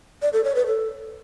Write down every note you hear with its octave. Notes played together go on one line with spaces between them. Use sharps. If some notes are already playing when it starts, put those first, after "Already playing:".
D5
A4
C#5
B4
A4